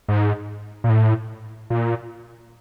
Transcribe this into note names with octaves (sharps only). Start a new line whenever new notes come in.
G#2
A#2
A2
A#2